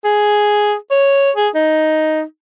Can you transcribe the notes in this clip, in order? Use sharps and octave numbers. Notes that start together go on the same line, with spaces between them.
G#4
C#5
G#4
D#4